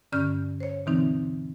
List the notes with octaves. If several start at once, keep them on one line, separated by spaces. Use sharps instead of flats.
G2 D3 C#4 D5 F6 G6
C5 C#5
B2 D3 E3 C4 D#4